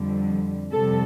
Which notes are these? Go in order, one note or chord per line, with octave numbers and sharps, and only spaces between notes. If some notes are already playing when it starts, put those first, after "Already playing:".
Already playing: F2 D3 G3
F2 C3 G3 A4